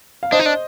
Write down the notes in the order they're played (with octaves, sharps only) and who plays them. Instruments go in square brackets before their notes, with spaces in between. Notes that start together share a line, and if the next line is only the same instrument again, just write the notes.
[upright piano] F5
[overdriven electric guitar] D4 [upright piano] C5 D#5
[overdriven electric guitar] D#4
D4